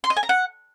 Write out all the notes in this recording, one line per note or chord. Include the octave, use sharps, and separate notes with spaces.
C6
D#5
G#5
A#5
F#5